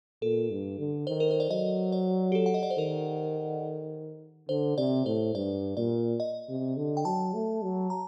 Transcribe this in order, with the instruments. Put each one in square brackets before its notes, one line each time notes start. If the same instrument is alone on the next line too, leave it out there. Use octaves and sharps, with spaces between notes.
[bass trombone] A#2 [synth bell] A4
[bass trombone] G2
D3
[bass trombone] D#3 [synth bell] C5
[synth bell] A#4
C5
D5
[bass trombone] F#3 [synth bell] D#5
[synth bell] D5
G4
A4
F#5
D#5
D5
C5
[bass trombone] D#3 [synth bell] A#4
[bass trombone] D3 [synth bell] C5
[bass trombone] C3 [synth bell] D5
[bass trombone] A2 [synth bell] C5
[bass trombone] G2 [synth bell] D5
[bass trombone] A#2 [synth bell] D5
[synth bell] D#5
[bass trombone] C3
D3
[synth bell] G5
[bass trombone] F#3 [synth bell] A5
[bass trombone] A3
F#3
[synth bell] A#5